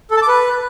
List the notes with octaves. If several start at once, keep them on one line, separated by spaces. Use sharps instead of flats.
A4
A5
D6
B4